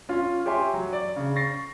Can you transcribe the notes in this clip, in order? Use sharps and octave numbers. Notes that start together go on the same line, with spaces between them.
C#4 F4
G4 C#5 E5 G#5 C6
F#3
D5
C#3
C#6 A6 A#6 C7